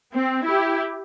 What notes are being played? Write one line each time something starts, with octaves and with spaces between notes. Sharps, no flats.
C4
E4 G4